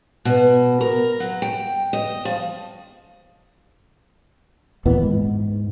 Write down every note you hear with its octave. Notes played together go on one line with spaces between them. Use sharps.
B2
A#4
F#3
G5
D#5
F3
D#2 A#2 E3 B3
G#2